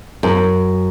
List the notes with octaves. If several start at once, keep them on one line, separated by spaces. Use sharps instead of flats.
F#2